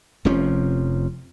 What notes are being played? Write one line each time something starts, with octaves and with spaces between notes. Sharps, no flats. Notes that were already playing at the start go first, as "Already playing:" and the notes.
F1 C3 F3 C#4